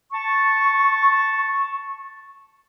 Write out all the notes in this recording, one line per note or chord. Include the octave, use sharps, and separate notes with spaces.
A5 C#6